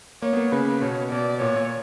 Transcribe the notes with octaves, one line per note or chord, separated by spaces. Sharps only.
A#3 C#5
B3
A#3
C#3 B4
B2 C#5
B2 D5
A#2 C#5
A#2